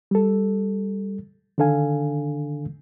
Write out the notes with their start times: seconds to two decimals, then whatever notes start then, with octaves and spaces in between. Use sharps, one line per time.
0.11 G3 A4
1.58 D3 D#3 D4 A4 F5 G#5